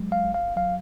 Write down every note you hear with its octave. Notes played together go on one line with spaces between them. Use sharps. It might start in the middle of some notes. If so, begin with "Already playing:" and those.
Already playing: F#3 G#3
F5
G#1
F5
F#3 F5